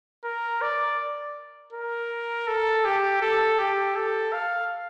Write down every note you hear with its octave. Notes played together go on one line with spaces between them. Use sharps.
A#4
D5
A#4
A4
G4
A4
G4
A4
F5